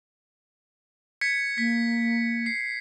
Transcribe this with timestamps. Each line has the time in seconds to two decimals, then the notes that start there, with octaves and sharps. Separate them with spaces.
1.21 G#6 B6 C#7
1.58 A#3 B6
2.46 C7